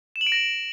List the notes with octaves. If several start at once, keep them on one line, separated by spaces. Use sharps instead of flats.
E7
F#7
D7
A#6